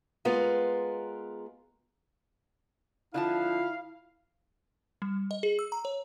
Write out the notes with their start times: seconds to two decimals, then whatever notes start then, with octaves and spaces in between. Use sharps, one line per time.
0.25 G#3 B3 F4 A#4
3.14 D3 F3 E4 F4 F5 A5
5.02 G3
5.31 D#5
5.43 G#4
5.59 E6
5.72 A#5
5.85 C#5